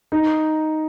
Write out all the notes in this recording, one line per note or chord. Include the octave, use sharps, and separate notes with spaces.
D#4